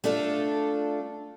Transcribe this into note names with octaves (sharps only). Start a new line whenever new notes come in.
A3 D4 F4 A4